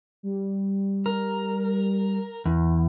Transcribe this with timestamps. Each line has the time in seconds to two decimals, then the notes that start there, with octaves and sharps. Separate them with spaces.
0.23 G3
1.06 A#4
2.45 E2